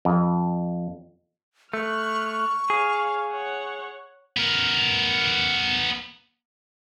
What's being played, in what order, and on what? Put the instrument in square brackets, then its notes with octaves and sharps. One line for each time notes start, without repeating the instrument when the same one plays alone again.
[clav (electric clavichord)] F2
[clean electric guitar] A3 [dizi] C#6 [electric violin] F6 F#6
[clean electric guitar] G#4 [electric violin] C#5 F5
[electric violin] C#5 F#5
[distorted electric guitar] B3 A#4